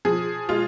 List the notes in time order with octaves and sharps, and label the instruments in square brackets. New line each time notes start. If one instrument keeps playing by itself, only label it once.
[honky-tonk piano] F3 G#4
G#3 F4